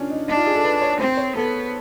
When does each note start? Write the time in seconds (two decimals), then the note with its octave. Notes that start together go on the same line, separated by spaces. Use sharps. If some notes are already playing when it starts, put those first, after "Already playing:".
Already playing: C#4 D4 F4
0.10 D#4
0.28 D4 D#4
0.37 F4
0.46 G#4
0.55 A4
0.64 B4
0.82 C#5
1.00 C4 C5
1.17 C#5
1.35 B3 A4